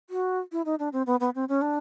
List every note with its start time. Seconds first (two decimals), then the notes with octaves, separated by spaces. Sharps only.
0.10 F#4
0.52 E4
0.65 D#4
0.79 D4
0.93 C4
1.06 B3
1.20 B3
1.35 C4
1.49 C#4
1.62 D4